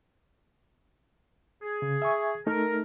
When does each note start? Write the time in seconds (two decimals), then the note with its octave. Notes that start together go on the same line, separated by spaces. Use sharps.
1.62 G#4
1.82 C#3
2.02 E5 G#5 C#6
2.47 A3 D#4 A4 A#4